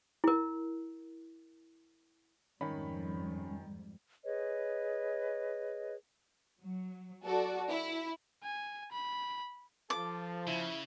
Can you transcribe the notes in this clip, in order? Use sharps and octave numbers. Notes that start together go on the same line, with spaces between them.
E4 A#4
F2 G#2 D#3 G3 C#4 B5
G#4 B4 C#5 D#5
F#3
F#4 A4 D5
E4
G#5
B5
F3 A4 D6
C#3 E4